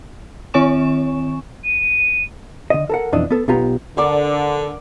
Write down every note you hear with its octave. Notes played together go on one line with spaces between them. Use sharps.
D#3 C4 C#5 G#5 C#6 E7
D#7
D3 D#5
A4 A#4 F#5
B1 F2 E3 D4 D#5
B3 A4
B1 B3 F4 G4 A#5
D3 A#4 D5 F#5